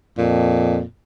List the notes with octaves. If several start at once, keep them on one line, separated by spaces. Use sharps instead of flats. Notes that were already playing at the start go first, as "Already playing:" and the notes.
F2 A#2